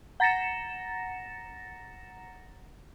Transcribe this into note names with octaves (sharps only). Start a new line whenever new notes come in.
F#5 A#5 A6 A#6 C#7 E7